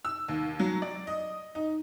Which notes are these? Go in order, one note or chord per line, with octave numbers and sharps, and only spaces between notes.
E6
D#2
F#3
D5
D#5
D#4